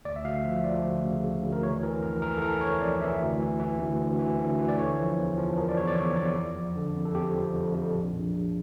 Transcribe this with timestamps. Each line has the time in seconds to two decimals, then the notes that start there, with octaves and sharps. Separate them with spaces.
0.05 D2 D5
0.16 E5
0.24 D2 F5
0.44 F3 E5
0.64 F3 D5
0.85 D2
1.03 C#3
1.24 C#3
1.43 D2
1.53 A#4
1.63 E3 C#5
1.83 E3 A#4
2.02 F2 A#4
2.22 E3 A#4
2.37 A4
2.42 E3 A#4
2.61 E3 C#5
2.81 F2 D5
3.01 E3 E5
3.21 D2
3.40 E3
3.60 E3
3.79 D2
3.99 D2
4.19 E3
4.39 D2
4.59 E3
4.68 D5
4.78 D3 C#5
4.98 F3
5.18 E2
5.38 F3
5.57 F3 A#4
5.69 D5
5.77 E2 C#5
5.87 D5
5.96 E2 C#5
6.16 E2 D5
6.36 F2
6.55 F3
6.75 D3
6.96 F2
7.05 A4
7.15 F2 G4
7.35 F3
7.54 F2
7.74 F2
7.94 A#1
8.13 A#1
8.33 A#1